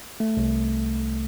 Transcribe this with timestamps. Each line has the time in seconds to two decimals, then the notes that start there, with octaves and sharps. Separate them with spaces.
0.20 A3
0.37 C2